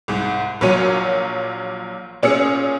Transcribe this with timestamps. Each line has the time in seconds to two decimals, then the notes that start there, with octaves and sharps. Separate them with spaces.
0.08 C2 G#2
0.61 A#1 A#2 F#3 C#5 D#7
2.23 A#2 C#4 G#4 E6 C#7